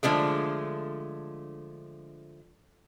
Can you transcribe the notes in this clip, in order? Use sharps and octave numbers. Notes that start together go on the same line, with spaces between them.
D3 F3 G#3 A3